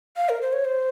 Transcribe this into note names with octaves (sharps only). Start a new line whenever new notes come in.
F5
A#4
C5
C#5
C5